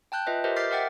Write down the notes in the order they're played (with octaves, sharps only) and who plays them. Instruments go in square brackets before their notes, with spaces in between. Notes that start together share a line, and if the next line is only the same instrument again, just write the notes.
[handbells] G5 A5 F#6 G6
F4 B4 D#5 E5
G4 A#4 C5 D#5 E5
D6 F6 G6 A6 B6 C7
A#4 E5 F#5 G5 A6